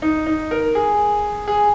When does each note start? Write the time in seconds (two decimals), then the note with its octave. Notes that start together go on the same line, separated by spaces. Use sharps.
0.02 D#4
0.26 D#4
0.51 A#4
0.75 G#4
1.48 G#4